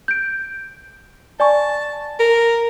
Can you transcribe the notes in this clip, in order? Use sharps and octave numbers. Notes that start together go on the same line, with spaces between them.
G6 D7
D5 G#5 A5 C#6
A#4